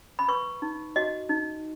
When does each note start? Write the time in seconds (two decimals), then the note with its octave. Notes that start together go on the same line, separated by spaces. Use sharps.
0.19 B5
0.28 B4 C#6
0.62 D#4
0.96 F#4 D#5
1.30 D#4